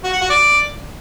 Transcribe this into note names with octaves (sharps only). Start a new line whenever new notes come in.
F#4
F#5
F#4
D5